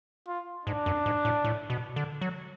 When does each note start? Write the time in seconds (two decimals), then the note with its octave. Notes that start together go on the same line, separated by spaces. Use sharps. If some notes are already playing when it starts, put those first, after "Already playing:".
0.27 F4
0.66 G#2 D4
0.86 F#2
1.06 G#2
1.25 A2
1.44 A2
1.70 B2
1.96 D3
2.21 F#3